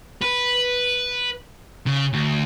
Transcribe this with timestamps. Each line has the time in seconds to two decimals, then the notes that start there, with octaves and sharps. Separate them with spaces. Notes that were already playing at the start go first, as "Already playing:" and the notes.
0.22 B4
1.87 C#3
2.14 D2